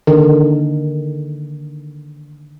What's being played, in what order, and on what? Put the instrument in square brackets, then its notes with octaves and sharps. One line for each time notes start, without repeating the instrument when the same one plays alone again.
[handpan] D3 D#3